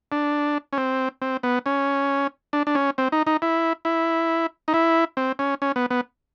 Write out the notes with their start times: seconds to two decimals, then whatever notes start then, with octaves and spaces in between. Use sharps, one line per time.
0.12 D4
0.73 C#4
0.78 C4
1.22 C4
1.43 B3
1.66 C#4
2.53 D4
2.67 D4
2.75 C#4
2.98 C4
3.12 D#4
3.27 D#4
3.42 E4
3.85 E4
4.68 D#4
4.74 E4
5.17 C4
5.39 C#4
5.62 C#4
5.76 B3
5.91 B3